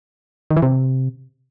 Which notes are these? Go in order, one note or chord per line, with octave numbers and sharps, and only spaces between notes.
D#3
E3
C3